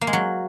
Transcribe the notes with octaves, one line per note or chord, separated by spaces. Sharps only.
A#3
G#3
F#3